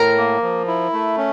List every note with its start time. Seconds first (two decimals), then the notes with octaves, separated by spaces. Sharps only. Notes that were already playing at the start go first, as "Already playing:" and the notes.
Already playing: A2 A#4
0.17 A#3
0.42 F3
0.67 E4
0.93 A3
1.17 C#4